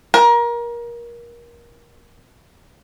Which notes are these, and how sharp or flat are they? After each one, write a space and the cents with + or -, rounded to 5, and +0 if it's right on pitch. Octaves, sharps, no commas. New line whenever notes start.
A#4 +25